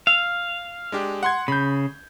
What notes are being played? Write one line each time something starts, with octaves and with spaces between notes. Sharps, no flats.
F5 E6
G#3 D4 G4
F#5 C6 G#6
C#3 B5 G6